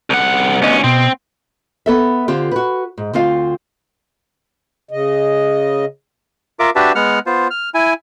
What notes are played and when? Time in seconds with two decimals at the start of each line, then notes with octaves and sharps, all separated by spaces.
0.10 C2 F#5
0.62 D2 B3 C#4 D#5
0.84 B2 C4
1.86 B3 A4 E5
2.28 D3 C4 F4 G4
2.51 F#4 B4
2.98 G#2
3.13 D2 C4 F4 F5
4.91 C#3 D#5
6.59 F4 A#4 E5 D6
6.76 D4 F#4 G4 B4 E5 A5
6.95 G#3 B3 F#5 F6
7.26 B3 F4 C5
7.50 F6
7.74 E4 G#5